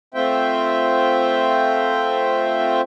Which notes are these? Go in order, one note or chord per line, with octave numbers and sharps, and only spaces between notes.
A3 C4 F4 C5 E5 G5